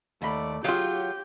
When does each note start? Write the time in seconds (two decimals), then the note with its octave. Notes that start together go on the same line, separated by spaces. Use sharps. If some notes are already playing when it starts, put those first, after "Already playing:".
0.22 D#2 A3 D5 B5
0.64 F#3 F4 G4 G#4 C#5 F5 G6